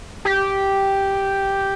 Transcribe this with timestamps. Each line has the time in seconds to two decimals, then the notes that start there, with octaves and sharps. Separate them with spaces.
0.25 G4